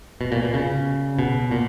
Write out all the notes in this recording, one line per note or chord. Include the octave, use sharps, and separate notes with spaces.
B2
A#2
B2
C#3
B2
A#2